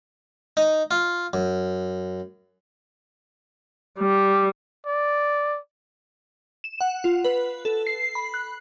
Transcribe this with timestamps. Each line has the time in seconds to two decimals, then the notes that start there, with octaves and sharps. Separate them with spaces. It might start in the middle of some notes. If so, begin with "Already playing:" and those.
0.57 D#4
0.91 F4
1.33 F#2
3.99 G3
4.86 D5
6.64 E7
6.81 F#5
7.04 F4
7.24 B4
7.65 A4
7.87 C7
8.15 B5
8.34 F#6